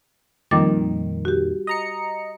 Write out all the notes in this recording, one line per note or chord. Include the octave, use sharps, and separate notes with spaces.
F2 A#2 D#3 G3 D6 A6
F#4 G4
D#5 A#5 C#7